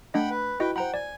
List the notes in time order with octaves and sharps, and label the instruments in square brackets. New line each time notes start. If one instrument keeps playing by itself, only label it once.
[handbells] A3 D4 D#5 [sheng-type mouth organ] F#5 G5 B5
[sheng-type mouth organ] B4
[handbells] E4 F#4 D#5 [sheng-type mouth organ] B4 G5
[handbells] C5 A#5 B5 [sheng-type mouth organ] F#5 G5
[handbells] D5 [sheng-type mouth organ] G#5